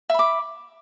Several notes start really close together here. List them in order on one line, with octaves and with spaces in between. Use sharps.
E5 B5 D6